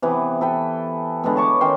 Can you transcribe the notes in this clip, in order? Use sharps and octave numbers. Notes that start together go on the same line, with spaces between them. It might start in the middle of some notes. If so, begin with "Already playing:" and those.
C3 E3 B3
A4 B4 G5
D3 G#3 B3
C#5 A5 C#6 D6
D#3 C#4 G5 C6